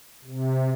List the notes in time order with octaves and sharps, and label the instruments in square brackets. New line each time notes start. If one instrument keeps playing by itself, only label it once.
[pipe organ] C3